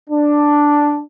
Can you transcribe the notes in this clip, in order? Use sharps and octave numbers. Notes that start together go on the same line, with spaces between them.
D4